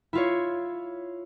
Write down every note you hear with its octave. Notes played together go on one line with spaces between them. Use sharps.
E4 F4 C#5